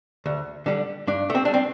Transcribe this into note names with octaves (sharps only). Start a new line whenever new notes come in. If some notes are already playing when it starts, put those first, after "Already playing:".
D2
D3 G3
G2 D4
A3
C4
G3 D4
C4